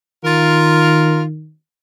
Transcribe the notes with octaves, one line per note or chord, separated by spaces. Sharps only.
D#3 F4 A#4